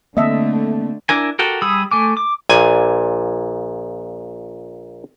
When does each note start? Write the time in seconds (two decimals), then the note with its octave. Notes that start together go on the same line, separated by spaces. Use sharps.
0.17 D3 A3 A#3 C4 D#5 E5 A5
1.09 D4 E4 A#4 G#5
1.39 F#4 G4 A4 A#4
1.62 G3 G#4 B5 D#6 E6
1.91 A3 G#5 D6
2.17 D6
2.49 A#1 A#2 G#5